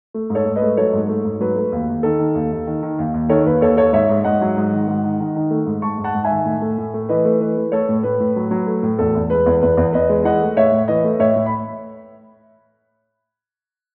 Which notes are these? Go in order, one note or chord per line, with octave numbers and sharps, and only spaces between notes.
A3
G#2
A4 C#5
G#2
B4 D#5
A3
F#3 A4 C#5
G#2
A3
G#2
F#3 B4
A3
D#2
D#2
D#3 A4
D#3
D#2
D#2
D#3
D#3
D#2
D#2
D#3 A4 C#5
D#2 B4
D#2 A4 C#5
D#2 A4 C#5
G#2 C#5 E5
G#2
G#2 D#5 F#5
F#3
G#2
D#3
G#2
D#3
D#3
D#3
A3
G#2
G#2 A5 C#6
G#2
F#5 A5
G#2
E5 G#5
D#3
A2
A3
A2
A3
E3 B4 D#5
A3
E3 B4
A3
A3 A4 C#5
A2
A2 B4
A2
F#3
F#3
A3
A2
E2 A4
E2
G#3 B4
E2
E2 B4
E2
E2 B4 D#5
G#3
E3 D#5 F#5
A3
A2 C#5 E5
A2
E3 B4 D#5
A3
A2 C#5 E5
A2
B5